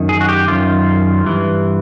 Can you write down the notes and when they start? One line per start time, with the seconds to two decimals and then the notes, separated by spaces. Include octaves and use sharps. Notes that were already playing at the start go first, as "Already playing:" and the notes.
Already playing: F#2 D#3
0.09 G#4
0.21 F#4
0.29 G4
0.48 F#2 D#3 F4
1.24 G2 E3